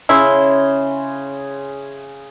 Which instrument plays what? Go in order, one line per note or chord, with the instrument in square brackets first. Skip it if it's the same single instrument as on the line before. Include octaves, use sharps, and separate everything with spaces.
[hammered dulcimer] C#3 G#4 C6 [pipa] E4